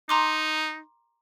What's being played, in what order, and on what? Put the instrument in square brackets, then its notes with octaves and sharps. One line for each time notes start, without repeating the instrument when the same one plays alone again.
[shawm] D#4 [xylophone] A#5 C6 D6